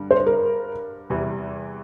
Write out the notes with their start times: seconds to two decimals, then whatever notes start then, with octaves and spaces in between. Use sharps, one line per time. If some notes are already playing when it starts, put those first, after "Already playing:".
Already playing: G2 D3 G3
0.11 C5
0.26 A#4
1.10 E2 C3 E3 G3